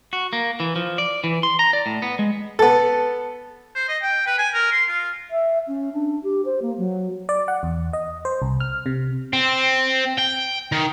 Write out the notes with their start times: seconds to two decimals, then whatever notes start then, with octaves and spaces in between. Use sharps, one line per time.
0.13 F#4
0.33 A#3
0.60 E3
0.76 F3
0.98 D5
1.24 E3
1.43 C6
1.59 A#5
1.73 D5
1.86 A2
2.02 B3
2.19 G#3
2.59 B3 A4
3.75 C5
3.88 D#5
4.02 G5
4.26 B4
4.38 G#5
4.53 A#4
4.71 C6
4.88 F4
5.31 E5
5.67 C#4
5.93 D4
6.23 G4
6.45 C5
6.62 A#3
6.78 F#3
7.29 D5
7.48 F#5
7.63 E2
7.93 D#5
8.25 C5
8.42 C2
8.60 F6
8.86 C3
9.33 C4
10.19 G5
10.72 D#3